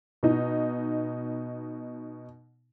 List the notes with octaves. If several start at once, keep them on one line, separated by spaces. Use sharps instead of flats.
B2 D#4